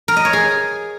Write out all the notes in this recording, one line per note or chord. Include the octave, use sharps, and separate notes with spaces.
A#4
D#5
C#5
G#4